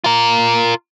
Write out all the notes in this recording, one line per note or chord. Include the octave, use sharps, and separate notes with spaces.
F4 A#4